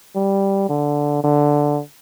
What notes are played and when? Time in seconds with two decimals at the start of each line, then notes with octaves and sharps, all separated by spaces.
0.16 G3
0.69 D3
1.23 D3